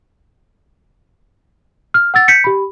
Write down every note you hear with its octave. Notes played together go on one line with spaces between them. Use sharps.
F6
F#5 E6 A6
G6 B6 C#7
G4 B5